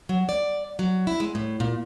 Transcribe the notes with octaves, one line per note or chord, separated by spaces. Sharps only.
F#3
D5
F#3
E4
G#3
A2
A#2